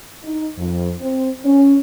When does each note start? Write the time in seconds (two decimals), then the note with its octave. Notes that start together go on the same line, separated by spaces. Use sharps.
0.24 D#4
0.58 F2
1.01 C4
1.45 C#4